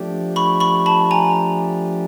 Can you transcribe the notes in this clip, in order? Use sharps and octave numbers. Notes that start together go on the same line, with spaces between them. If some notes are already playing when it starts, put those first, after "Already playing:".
Already playing: F3 A3 D4 G4
B5 C#6
B5 C#6
A5 B5
G#5 A#5